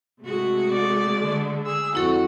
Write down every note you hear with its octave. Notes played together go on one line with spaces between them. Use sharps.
C3 G#3 A3 F#4
D5
D3
G#4 E6
F2 C4 E4 F#4 A4